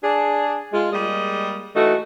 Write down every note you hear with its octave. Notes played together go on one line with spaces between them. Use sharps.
D4 G#4
G#3 F4
G3 G#3 A#3 D#5
E3 A3 D#4 F#4